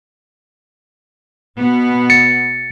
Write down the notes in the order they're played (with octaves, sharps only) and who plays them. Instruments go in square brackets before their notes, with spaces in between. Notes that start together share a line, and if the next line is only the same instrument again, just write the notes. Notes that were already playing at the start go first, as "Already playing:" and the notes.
[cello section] B2 B3
[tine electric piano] A6 C#7